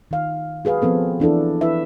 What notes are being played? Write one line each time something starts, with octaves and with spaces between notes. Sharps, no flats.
D#3 F5
F#4 G#4 B4 F5
F3 B3 C4 A4
E3 D4 E4 A4
E4 B4 E5